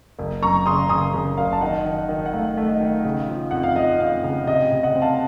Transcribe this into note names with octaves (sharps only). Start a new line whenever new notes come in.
F#1
F#2 A#5 C#6
C#3 C6 D#6
C#3 C6 D#6
C#3
F#1 F5
A5
D#3 D#5 F#5
D#3
D#3
F#5
A3 F5
A3
D#5 F#5
D#3
C#3
F3
F2 F#5
F5
F3 D#5
F2 F5
C#3
C3 D#5
C3
D#5 F#5
C4
F5 A5